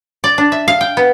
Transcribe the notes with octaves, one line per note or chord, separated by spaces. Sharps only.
D5
D4
E5
F5
G5
B3